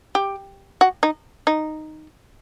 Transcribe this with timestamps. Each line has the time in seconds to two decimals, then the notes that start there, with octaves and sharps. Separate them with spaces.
0.15 G4
0.81 F#4
1.03 D#4
1.47 D#4